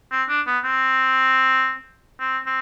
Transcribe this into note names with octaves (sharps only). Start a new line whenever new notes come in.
C4
D4
B3
C4
C4
C4